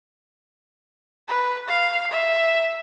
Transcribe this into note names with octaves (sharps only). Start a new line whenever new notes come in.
B4
F5
E5